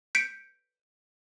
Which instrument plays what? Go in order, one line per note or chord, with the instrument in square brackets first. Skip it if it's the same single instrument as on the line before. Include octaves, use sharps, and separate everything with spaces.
[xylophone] G6 B6 C#7 D7